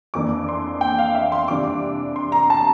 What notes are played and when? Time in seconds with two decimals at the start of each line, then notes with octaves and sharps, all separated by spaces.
0.14 F2 E3 A#3 D4 D6
0.48 C6
0.81 G5
0.99 F5
1.15 E5
1.32 C6
1.48 C3 E3 G3 D4 D6
2.16 C6
2.32 A#5
2.50 A5